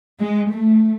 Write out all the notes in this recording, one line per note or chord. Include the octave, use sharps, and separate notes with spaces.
G#3
A3